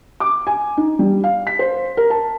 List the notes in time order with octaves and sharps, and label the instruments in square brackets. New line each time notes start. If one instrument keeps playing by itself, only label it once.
[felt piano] D6
G#5
D#4
G3
F5
B6
C5
A#4
A5